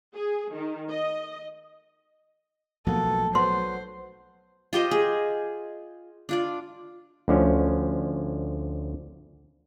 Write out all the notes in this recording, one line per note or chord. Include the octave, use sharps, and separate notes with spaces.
G#4
D#3
D#5
B1 B2 F3 A3 A#3 A4
F#3 B3 C5 C6
F4 G4 C5 D#5
G#4
D4 F4 D5
D2 D3 F3 C#4